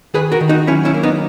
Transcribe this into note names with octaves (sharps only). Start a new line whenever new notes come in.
D#3 G#4 B4
F#4 A#4
D#3
D#4 F#4
F#3 C#4 E4
C#4 E4
A#3
B3 D#4